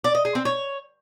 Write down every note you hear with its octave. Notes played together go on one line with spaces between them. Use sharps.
D5
D#5
G#4
C4
C#5